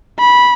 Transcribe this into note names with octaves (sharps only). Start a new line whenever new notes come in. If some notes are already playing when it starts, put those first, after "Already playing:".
B5